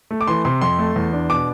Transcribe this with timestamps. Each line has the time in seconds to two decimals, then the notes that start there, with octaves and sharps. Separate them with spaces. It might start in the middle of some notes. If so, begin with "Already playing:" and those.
0.11 A3
0.21 D6
0.27 E3 C6
0.45 C3 C6
0.61 F2 C6
0.79 A3
0.96 E2
1.13 D4
1.30 B2 D6